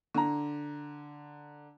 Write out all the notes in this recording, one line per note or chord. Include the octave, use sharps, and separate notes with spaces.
D3 A#5